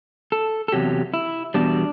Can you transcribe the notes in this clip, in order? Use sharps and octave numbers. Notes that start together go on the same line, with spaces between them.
A4
A4
E2 C3 F#3 G4
E4
E2 B2 G3 D4